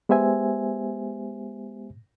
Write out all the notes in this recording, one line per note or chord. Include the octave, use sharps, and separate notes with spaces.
G#3 B3 G4 C5 E5 G#5